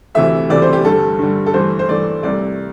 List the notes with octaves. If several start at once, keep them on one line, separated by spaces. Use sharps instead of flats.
D2 C3 E3 A3 E5
D2 C3 E3 A3 D5
C5
G4
G2 D3 G3 A4
G2 D3 G3
A4
G2 E3 A3 C5
C5
G2 E3 A3 D5
C2 C3 A3 D5